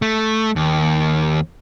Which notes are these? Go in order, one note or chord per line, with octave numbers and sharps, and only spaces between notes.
A3
D#2